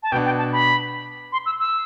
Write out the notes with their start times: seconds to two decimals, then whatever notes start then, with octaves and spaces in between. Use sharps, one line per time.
0.03 A5
0.12 B2 B3 D4 G5
0.25 G5
0.39 A5
0.52 B5
1.33 C6
1.46 E6
1.59 E6